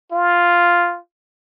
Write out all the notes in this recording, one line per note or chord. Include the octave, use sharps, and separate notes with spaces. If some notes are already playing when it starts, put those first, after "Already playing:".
F4